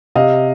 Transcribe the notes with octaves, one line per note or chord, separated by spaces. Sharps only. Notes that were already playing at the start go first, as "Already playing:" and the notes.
C3 D#5 F5